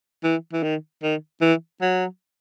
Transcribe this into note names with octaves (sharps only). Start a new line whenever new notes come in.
E3
E3
D#3
D#3
E3
F#3